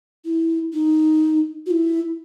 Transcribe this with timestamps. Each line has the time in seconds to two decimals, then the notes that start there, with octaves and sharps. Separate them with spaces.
0.25 E4
0.73 D#4
1.66 F#4
1.71 E4